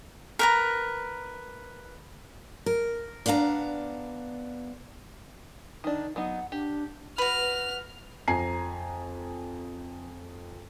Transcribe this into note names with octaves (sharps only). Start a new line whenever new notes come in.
A#4 B4 A#5
A#4
B3 D4 F5 F#5 A#5
D#3 D4 D#4
F#3 B3 D#4 F#5
D4 G4
F#4 B4 F6
F2 G#5 A#5 C7